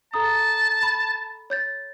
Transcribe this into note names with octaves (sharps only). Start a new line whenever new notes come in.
A4 A5 A#5 D#6
B5
C#5 G6 A6